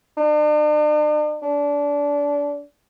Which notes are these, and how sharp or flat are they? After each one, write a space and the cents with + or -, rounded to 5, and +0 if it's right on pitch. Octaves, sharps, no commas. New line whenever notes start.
D4 +45
D4 -25